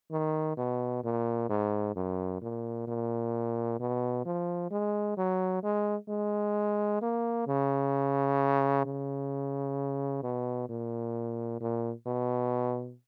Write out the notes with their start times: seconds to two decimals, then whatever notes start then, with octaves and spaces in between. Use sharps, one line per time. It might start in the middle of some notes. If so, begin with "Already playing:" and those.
0.11 D#3
0.57 B2
1.04 A#2
1.49 G#2
1.96 F#2
2.42 A#2
2.87 A#2
3.80 B2
4.25 F3
4.71 G#3
5.17 F#3
5.63 G#3
6.08 G#3
7.02 A#3
7.47 C#3
8.85 C#3
10.23 B2
10.69 A#2
11.60 A#2
12.06 B2